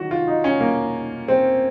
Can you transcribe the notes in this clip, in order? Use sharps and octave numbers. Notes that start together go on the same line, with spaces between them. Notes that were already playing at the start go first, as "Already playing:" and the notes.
Already playing: D#3 F#3 F#4
F4
D#4
C#4
A#3
C4